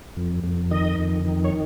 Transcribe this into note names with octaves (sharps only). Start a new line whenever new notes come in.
F2
F2
D#3 D#5
F2
D#3
C#5